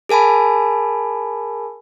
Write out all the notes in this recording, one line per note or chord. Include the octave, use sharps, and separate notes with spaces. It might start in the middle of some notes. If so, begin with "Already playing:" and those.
G#4 A#4 G#5 A5 B5